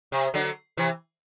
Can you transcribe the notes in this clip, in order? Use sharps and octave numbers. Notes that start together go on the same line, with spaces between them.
C3
D3 F#3
C3 E3